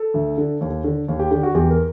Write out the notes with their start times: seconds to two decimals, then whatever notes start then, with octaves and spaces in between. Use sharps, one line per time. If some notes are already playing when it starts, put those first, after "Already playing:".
Already playing: A4
0.14 D2
0.38 D3
0.61 D#2
0.84 D3
1.08 D#2
1.19 G4
1.31 D3 G4
1.43 F#4
1.55 E2 G4
1.70 A#4